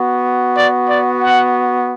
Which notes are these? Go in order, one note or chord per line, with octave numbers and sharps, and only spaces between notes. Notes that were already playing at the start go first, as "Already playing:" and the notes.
Already playing: B3 F#4
D5
D5
F#5